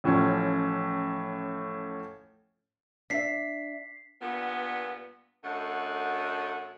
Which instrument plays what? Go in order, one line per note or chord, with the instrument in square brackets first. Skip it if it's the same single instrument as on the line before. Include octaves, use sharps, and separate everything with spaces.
[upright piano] A1 A2 F3 C#4
[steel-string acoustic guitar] D4 E5 [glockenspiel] B6 C7
[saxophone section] G2 A#2 B3
F#2 D3 A3 D#5 F#5